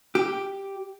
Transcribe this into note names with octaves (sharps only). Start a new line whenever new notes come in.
G4